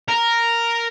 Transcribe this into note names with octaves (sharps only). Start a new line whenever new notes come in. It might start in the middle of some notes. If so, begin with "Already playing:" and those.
A#4